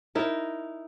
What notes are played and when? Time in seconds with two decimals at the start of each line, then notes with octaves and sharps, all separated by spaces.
0.15 D#4 E4 A#4